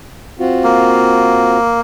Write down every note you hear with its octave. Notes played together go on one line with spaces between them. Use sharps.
C4 F4 F#4
A#3